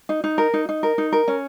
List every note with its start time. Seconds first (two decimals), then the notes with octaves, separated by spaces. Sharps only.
0.09 D#4
0.24 D#4
0.38 A#4
0.54 D#4
0.69 D#4
0.83 A#4
0.98 D#4
1.12 A#4
1.28 C#4